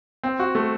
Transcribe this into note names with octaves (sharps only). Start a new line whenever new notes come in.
C4
F#4
A3